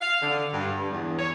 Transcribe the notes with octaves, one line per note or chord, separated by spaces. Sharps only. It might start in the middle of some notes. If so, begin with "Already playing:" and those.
F5
D3
G2
G2
E2
C#5